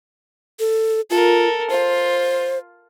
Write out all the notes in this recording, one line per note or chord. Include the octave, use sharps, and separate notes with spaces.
A4
F4 A4 A#4
F4 C5